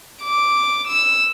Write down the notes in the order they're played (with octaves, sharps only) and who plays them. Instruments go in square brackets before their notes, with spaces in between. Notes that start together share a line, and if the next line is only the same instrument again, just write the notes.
[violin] D6
E6